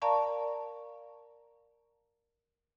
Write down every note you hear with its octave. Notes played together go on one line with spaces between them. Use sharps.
A#4 D5 F5 A5 A#5 C#6